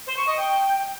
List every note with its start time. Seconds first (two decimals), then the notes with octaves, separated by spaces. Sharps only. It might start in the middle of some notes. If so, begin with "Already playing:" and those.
0.07 C5
0.17 C#6
0.27 D#5
0.37 G5